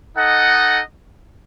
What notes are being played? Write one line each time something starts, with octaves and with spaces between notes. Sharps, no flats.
D#4 A4 D#5 F#5